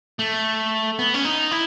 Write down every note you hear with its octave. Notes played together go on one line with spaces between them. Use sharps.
A3
B3
C#4
D#4
E4